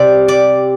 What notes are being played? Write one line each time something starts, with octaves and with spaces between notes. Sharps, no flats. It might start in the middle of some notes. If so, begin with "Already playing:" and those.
Already playing: C3 G4 D5
D5